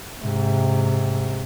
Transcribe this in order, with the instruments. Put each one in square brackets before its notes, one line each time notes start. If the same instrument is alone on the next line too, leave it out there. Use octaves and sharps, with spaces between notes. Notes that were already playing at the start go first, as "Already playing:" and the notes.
[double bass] G#2 C3